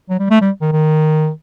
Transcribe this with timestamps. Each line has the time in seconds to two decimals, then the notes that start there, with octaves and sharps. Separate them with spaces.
0.09 F#3
0.19 G3
0.30 A3
0.41 G3
0.61 D#3
0.72 D#3